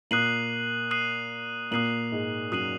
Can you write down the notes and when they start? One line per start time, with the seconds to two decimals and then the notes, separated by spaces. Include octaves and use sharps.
0.11 A#2 A#3 D#6 F#6 C7 D#7 F#7
0.91 D#6 F#6 C7 D#7 F#7
1.71 A#2 A#3 D#6 F#6 C7 D#7 F#7
2.11 G#2 G#3
2.52 F#2 F#3 D#6 F#6 C7 D#7 F#7